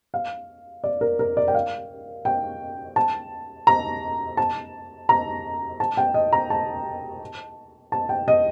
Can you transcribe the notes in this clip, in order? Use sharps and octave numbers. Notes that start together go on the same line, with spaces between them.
F5
D5
A#4
A#4
D5
G5
F5
G5
A5
A#5
A5
A#5
A5
G5
D#5
A#5
A5
A5
G5
D#5